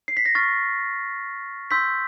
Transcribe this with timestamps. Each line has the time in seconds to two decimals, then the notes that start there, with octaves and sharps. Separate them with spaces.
0.08 C7
0.17 B6
0.25 A#6
0.35 C#6 F6 A6
1.71 C6 E6 G6 B6